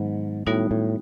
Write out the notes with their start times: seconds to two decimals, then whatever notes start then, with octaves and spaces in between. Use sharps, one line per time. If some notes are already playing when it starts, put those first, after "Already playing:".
Already playing: G#2 D#3 F#3 B3
0.47 A2 G3 B3 D#4 F#4
0.71 A2